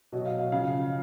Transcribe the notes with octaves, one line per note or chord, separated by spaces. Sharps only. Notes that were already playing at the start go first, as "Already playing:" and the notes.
B2 F#3 D#5
F5
F5
C#3 F3 F5